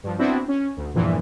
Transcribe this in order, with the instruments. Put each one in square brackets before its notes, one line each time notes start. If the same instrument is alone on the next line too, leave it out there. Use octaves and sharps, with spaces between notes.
[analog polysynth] G2 F3
B3 C4 D4 E4 F#4
C#4
D2
E2 G2 A#2 E3 F3